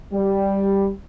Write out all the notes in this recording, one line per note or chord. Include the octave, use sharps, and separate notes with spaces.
G3